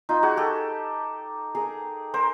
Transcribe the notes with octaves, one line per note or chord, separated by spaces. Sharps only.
D#4 F4
F#4 G#4
G4 A4
G#4 A#4
A#4 C5